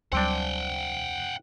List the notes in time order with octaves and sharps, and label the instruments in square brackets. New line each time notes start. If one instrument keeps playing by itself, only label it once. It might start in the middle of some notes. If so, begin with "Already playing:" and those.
[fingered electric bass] D2 F#3 G3 [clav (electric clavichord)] C4 D4 [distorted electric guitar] F#5 G5